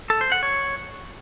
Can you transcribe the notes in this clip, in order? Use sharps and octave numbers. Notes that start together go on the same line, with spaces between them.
A4
C5
F#5
C#5